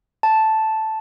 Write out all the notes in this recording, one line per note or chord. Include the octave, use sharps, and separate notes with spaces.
A5